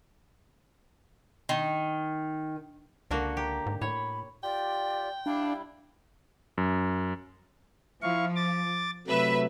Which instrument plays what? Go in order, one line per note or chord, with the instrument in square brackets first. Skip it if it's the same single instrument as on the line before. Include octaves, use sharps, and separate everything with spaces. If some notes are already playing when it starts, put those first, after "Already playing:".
[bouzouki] D#3
[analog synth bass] C#2 [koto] D3 A#3 F#4
[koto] G4 [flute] A#5
[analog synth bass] G#2
[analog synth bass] A2 [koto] C#5 [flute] B5
[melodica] F4 G4 [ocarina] D5 [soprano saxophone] G5
[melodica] G3 E4 [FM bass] D4 [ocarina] F5
[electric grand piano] F#2
[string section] F3 [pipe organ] E4 F5 C#6
[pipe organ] D6 A6
[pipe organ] C3 F#3 A3 [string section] B4 E5